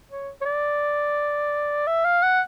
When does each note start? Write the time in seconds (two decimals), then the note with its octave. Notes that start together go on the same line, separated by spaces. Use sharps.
0.11 C#5
0.41 C#5
0.45 D5
1.87 E5
2.05 F5
2.23 F#5